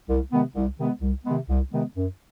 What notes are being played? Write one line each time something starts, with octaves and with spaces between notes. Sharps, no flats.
C2
C3 D#3 G#3 B3
C2
C3 D#3 G#3 B3
C2
C3 D#3 G#3 B3
C2
C3 D#3 G#3 B3
F#2